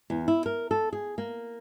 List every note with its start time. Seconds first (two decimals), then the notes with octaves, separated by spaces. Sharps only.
0.10 E2
0.28 E4
0.46 A#4
0.71 A4
0.93 G#4
1.18 A#3